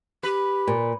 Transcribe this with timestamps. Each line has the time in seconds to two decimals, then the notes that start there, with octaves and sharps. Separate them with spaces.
0.23 G4 B4
0.67 A#2